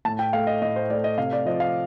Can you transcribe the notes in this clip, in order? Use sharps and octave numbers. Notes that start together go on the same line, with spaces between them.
A2 A5
G5
A3 F5
D#5
A2 D#5
C5
A3 D5
D#5
C3 F5
D5
F3 D#5
F5